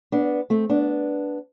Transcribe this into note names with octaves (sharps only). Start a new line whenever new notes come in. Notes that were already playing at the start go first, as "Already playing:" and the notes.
B3 D4
A3 C4
B3 D4